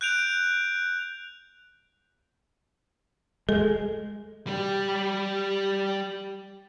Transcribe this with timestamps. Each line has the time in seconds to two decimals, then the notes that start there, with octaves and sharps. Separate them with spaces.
0.01 F#6 G6 D7 F7
3.49 G#3 A4
4.47 G3 G4